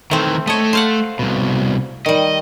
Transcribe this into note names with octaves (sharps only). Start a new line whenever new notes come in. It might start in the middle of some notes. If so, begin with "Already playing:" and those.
D#3 E3 A3 C4
A3 C#5 D#5 A5
C5 F5 F#5
C2 B2
D#3 G3 D#5